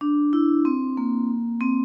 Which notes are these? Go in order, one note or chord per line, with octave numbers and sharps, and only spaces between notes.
D4
E4
C4
A#3
C4